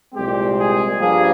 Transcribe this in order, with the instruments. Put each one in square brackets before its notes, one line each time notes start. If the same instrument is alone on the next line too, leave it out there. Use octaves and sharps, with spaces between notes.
[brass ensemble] C2 A#2 G#3 C4 G4
G#4
G2 F3 A#3 G#4